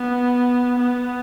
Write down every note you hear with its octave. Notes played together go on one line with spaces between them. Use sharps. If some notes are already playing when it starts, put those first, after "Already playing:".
Already playing: B3
B3